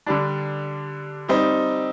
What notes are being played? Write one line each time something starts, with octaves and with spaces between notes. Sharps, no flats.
D3 G3 D4
G3 C4 D#4